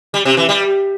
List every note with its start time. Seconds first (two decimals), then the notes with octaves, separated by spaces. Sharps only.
0.14 G3
0.25 C3
0.37 E3
0.49 G3